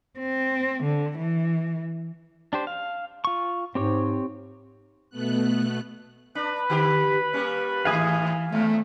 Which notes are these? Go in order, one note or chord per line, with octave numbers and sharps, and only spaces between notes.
C4
D3
E3
D4 G4 C5
F5
F4 C#6
G#2 C4 G4 C#5
B2 A3 B3 F#6
D4 B4 B5
D3 G4
G3 A#3 C#4
G#2 D#3 E3 G#4 F5 G#5 D#6
D#2 A3